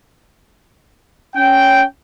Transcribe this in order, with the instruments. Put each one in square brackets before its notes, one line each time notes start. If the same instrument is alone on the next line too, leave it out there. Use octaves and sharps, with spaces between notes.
[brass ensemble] C#4 G5